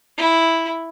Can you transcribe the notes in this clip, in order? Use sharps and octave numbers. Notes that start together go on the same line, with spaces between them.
E4